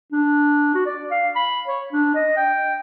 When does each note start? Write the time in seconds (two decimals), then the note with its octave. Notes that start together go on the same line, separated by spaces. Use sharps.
0.12 D4
0.75 F#4
0.86 D5
1.11 F5
1.36 B5
1.68 C#5
1.93 D4
2.15 D#5
2.37 G5